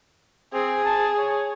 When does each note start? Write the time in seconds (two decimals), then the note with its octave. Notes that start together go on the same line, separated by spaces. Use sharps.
0.53 C4 G#4
0.85 A5
1.18 C#5